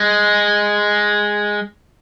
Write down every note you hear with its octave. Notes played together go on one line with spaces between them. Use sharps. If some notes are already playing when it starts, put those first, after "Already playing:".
Already playing: G#3